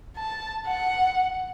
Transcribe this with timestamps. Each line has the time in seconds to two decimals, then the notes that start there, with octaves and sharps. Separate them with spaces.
0.17 A5
0.67 F#5